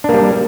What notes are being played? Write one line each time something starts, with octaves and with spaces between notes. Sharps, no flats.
G3 A#3 D4